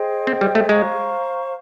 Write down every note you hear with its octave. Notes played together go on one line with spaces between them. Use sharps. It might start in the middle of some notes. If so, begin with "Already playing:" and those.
Already playing: G#4 C5 D#5 G5
C4
G3
A3
G#3 C5 F5 A#5 C#6